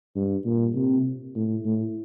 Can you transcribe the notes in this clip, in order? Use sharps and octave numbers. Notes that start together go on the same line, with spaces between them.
G2
A#2
C3
A2
A2